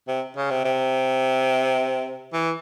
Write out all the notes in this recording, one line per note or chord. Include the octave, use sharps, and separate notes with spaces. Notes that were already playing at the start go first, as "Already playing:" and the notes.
C3
C#3
C3
C3
E3